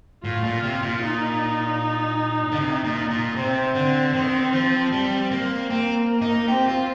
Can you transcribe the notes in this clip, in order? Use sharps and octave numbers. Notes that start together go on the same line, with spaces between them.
A2 F4
A#2
C3
A#2
D#4
D3
C3
A#2
A#2
C3 C4
D3
D#3
F3
G3
A#3
A#3 C4
D#4
C4 G4
F4